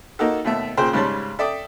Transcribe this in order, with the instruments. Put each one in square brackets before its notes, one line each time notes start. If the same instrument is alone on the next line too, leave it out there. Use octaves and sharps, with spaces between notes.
[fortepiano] A#3 D#4 F#4 A4
D#2 B2 A3 E5
A#2 C#3 G#4 C5 G5 C6
G#2 C#3 G3 C#5 A5 C6
A4 D5 E5 G5 D6 D#6